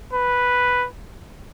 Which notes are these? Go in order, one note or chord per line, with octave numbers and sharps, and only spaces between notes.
B4